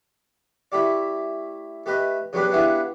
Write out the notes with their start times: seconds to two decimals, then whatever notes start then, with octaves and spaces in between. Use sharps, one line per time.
0.72 A3 E4 G4 D5
1.86 A3 G4 B4 D#5
2.33 C#3 F#3 B3 D4 G4 B4
2.52 B3 D4 E4 F4 G4 G#4